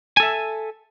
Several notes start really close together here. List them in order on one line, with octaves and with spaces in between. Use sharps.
G#5 A4 E5